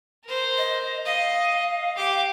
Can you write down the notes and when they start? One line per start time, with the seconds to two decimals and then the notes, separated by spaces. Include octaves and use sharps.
0.24 A#4 C5
0.58 D#5
1.06 D#5 F5
1.96 G4 D6